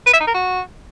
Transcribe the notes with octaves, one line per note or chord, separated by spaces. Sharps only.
B4
E5
D#4
A#4
F#4